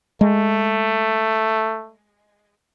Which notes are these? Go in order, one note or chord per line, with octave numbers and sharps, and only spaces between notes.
G#3 A3